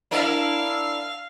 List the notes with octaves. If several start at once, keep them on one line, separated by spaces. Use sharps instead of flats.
D4 E4 A#4 F5